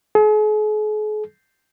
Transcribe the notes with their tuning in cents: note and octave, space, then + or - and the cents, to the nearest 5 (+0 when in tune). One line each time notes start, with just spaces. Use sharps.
G#4 +45